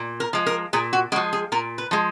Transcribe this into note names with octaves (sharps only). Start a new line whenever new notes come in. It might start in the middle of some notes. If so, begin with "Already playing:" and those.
Already playing: A#2
A#4
F3 G#3
A#4
A#2 G#4
F#4
F3 G#3 F#4
G#4
A#2 A#4
B4
F3 G#3